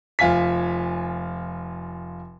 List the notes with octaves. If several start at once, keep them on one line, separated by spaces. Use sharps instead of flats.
F1 F4 G#5 B6